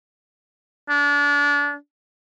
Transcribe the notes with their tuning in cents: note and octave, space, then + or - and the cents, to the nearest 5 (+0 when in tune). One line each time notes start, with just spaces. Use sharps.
D4 -30